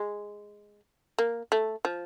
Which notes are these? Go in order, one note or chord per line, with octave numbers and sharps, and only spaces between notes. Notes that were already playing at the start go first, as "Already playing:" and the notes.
Already playing: G#3
A#3
A3
F3